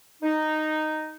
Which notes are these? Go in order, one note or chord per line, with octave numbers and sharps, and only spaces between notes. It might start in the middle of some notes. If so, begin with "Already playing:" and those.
D#4